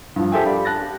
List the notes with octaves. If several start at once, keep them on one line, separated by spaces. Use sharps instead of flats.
G2 F3
G4 A4 C5 E5 G5 G#5
G4 D5 F5 B5
A5 F#6 A6 A#6
G4